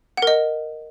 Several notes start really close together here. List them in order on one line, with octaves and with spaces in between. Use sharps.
F#5 A#4 D#5